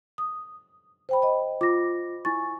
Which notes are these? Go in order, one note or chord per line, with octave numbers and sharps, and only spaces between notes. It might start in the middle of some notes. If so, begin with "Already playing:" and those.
D#6
C5 G5 B5
D#5 B5
F4 D6 A#6
E4 G#5 C#6 A6